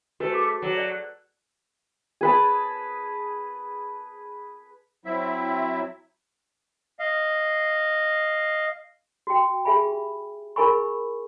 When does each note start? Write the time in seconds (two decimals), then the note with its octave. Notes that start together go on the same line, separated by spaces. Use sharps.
0.20 A3 F#4 B4 C5
0.32 F#4 G#4 D6
0.62 F#3
0.77 D5
2.21 G#4 B4 A5
5.05 F#3 C4 E4 E5
6.99 D#5 F5
9.27 F#4 G5
9.65 G4 G#4 E5 G#5 B5
10.56 E4 G#4 A#4 G#5 B5 C#6